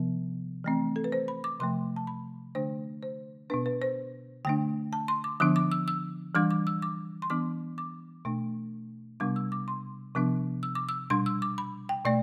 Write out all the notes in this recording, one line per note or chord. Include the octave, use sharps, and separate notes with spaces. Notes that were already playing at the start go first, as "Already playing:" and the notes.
Already playing: C3 F3 B3
E3 A3 C4
A4
B4
C5
B5
D6
C3 F3 A3 C6
A5
B5
D3 A3 D4 C5
C5
B2 B3 D4 B4
B4
C5
D3 A3 D4 G5
A5
C6
D6
D3 F3 B3 D4 D6
D6
E6
E6
E3 G3 D4 D6
D6
E6
D6
C6
E3 B3 D4 D6
D6
B2 A3 D4
C3 G3 B3 D4 D6
E6
D6
C6
C3 F3 B3 D4 D6
E6
D6
E6
B2 G3 D4 C6
E6
D6
B5
G5
B2 A3 D5